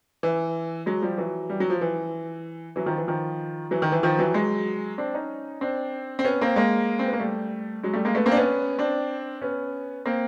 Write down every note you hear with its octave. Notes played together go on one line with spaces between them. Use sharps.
E3
F#3 G#3
F3 G3
E3 F#3
G3
F#3
F3
E3
E3 F#3
D#3 F3
E3
D#3 F3
E3 F#3
D#3
E3
D#3 F3
E3 F#3
F#3 G#3
C4 D4
C#4 D#4
C4 D4
C4
B3 C#4
A#3 C4
G#3 A#3
C4
B3
A#3
G3 A3
F#3 G#3
G3 A3
G#3 A#3
A3 B3
A#3 C4
D4
B3 C#4
C4 D4
B3 C#4
A#3 C4